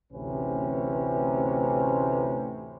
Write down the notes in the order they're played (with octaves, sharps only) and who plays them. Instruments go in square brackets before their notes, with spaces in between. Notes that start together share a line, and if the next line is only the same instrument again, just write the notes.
[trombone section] A1 D2 C3 C#4 B4